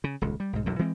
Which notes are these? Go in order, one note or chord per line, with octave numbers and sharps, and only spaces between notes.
C#3
D#1 C#2
G3
B1 G#2
B1 F#2 E3
E3 G#3 C4